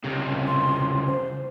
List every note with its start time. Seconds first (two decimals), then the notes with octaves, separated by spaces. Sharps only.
0.05 C#2 C3
0.46 C6
1.07 C5